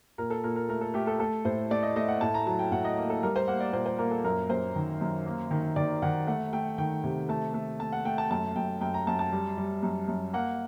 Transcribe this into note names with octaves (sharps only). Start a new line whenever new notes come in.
A#2 A#4
A4
A#2 A#4
A#4
A3 A#4
A4
A3 G4
A4
A3 A4
A2 C5
A3 D5
D#5
A3 D#5
F#5
A2 A5
A#5
F#3 A5
G5
A2 F#5
D#5
A#3
A4
G3 A#4
C5
A#3 F#5
D5
A#2 C5
C5
A#3 A#4
A4
F#2 A#4
F#2 C5
D#3
F#2
A#3
D#3
D#3 D5
D#3 F#5
A3 F#5
A3 G5
D#3 G5
C3
A3 A5
A3
A3 A5
F#5
A3 G5
A5
F#2 A5
F#2 G5
F#2 G5
A#5
F#2 A5
A5
G3
G3
F#2
F#2
A#3 F#5